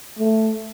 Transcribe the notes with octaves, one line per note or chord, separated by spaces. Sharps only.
A3